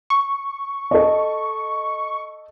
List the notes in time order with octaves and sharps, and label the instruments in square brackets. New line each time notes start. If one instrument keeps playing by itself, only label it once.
[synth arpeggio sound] C#6
[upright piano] A4 D#5